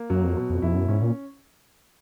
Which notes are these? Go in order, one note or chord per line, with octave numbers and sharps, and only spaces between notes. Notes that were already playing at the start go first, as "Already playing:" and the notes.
Already playing: A#3
F#2 F#3
F2
B2
F2
F2 E4
F#2
G#2 C#4
A#2